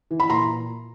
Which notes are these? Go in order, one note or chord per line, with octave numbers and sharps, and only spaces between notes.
E3
B5
A#2 A#5 C6